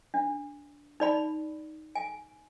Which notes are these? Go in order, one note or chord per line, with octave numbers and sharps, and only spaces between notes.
D4
D#4 D5 B5
G#5